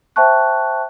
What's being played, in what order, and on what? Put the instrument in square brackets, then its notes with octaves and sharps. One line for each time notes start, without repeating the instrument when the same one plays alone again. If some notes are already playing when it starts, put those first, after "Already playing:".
[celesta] C5 E5 G5 A5 C#6 F#6